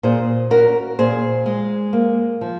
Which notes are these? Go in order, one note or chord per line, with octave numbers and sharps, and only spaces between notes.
A#2 G#4 C5
C#4 F#4 A#4
A#2 G#4 C5
G#3
A#3
F3